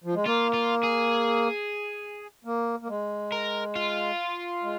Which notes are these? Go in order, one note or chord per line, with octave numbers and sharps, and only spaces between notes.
F3
G#3
A#3 F4
F4
G#4
A#3
A#3
G#3
A#4
F4
G#3